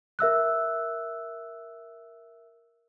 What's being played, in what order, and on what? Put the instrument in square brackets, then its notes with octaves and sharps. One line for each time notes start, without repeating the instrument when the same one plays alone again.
[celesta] A#4 E5 E6 F#6